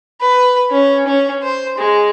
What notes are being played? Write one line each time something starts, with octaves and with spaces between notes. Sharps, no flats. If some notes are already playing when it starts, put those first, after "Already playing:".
B4
C#4
C#4
C5
G#3